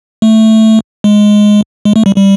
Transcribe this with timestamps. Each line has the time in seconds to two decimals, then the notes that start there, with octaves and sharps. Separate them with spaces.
0.22 A3
1.04 G#3
1.85 G#3
1.96 A3
2.06 G3
2.16 G3